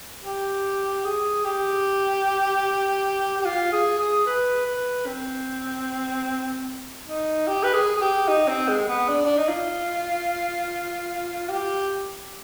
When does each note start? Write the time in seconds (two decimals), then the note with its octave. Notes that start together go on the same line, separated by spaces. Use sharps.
0.23 G4
1.04 G#4
1.45 G4
3.40 G4
3.46 F4
3.72 G#4
3.99 G#4
4.26 B4
4.66 B4
5.06 C4
7.07 D#4
7.47 G4
7.64 B4
7.74 G#4
7.96 G#4
8.01 G4
8.28 D#4
8.48 C4
8.68 G#3
8.88 B3
9.08 D4
9.25 D4
9.37 D#4
9.48 F4
11.49 G4